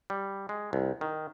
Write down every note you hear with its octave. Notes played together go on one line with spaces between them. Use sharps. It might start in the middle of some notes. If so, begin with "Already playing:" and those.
G3
G#3
C2
D#3